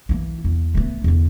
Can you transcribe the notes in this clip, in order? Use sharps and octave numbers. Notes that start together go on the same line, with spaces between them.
E3 A#3
E2
A3 B3
E2 D3